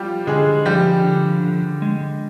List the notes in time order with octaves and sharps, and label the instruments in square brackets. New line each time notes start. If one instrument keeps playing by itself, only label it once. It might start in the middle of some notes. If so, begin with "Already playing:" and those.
Already playing: [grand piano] F3 G3 F4 G4
[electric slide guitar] D3 [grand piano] G#3 G#4
[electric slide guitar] F3 [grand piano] G3 G4
[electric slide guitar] D3
D3
G#3